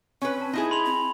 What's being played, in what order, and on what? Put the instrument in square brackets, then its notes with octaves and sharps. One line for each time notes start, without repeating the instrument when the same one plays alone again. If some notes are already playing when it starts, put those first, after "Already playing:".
[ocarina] C4 [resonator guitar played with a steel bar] C#4 B4
[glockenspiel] A5
[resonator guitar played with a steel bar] D#4 E4 G#4
[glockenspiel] B5 C6 F7
[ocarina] C4